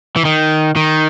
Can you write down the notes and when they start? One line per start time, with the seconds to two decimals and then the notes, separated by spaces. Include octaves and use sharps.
0.16 E3
0.25 D#3
0.76 D#3